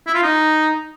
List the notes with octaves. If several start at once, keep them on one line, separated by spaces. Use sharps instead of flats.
E4
F4
D#4